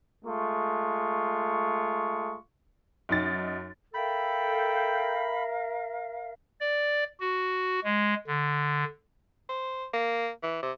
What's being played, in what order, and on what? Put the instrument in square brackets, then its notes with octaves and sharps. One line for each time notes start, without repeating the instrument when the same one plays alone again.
[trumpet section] G#3 A3 F4 C#6
[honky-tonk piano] F#2 D#4 A6
[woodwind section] A4 G5 [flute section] A#4 E5 F5 [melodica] B5
[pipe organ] D5
F#4
G#3
D3
[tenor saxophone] C5
A#3
E3
C3